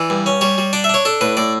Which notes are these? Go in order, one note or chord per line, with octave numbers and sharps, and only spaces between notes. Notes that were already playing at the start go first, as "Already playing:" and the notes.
Already playing: E3 D5
G2
C#4
G3 C#5
G3
D4 D5
E5
D4 C#5
D4 A4
A2 B4
A2 D5